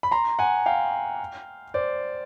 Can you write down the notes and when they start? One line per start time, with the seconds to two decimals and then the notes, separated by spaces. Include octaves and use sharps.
0.03 B5
0.11 A#5 C6
0.39 F#5 G#5
0.66 F5 G5
1.74 C5 D5